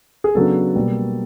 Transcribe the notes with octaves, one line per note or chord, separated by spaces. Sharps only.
G#4
C#3 F#3 B3 D4 A4
B2 G3 A#3